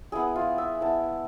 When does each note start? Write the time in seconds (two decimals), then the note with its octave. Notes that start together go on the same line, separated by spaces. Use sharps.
0.12 B3 E4 G#4
0.36 F4
0.58 E5
0.81 B3 E4 A5